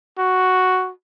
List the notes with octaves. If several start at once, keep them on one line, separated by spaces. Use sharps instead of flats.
F#4